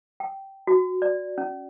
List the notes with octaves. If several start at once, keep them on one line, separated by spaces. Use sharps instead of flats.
G5
F#4
D5
C#4